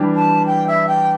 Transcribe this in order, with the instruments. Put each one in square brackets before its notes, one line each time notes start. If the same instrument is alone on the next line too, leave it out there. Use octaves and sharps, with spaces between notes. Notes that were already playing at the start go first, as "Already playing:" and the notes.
Already playing: [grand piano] E3 G3 D4 G4
[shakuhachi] A5
G5
E5
G5